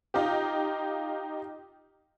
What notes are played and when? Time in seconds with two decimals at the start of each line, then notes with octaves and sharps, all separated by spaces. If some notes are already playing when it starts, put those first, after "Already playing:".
0.14 D#4 F4 G4